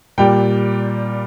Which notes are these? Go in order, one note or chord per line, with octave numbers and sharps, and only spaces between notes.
A#2 G3 G5